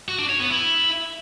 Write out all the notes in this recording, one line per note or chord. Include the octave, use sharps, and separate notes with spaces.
F#4
D4
C#5
B3
E4